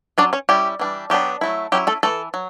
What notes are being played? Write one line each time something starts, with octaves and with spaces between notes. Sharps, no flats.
F#3 C#4 D4 D5
C#4 C#5
G3 C#4 E4 G4
E3 G3 D4
F#3 B3 D4 G4
F#3 A3 E4
F#3 C#4 E4 G4
A3 A4
E3 A3 A4
F#3